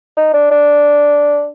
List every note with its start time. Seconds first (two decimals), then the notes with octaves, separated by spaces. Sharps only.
0.17 D#4
0.34 D4
0.51 D4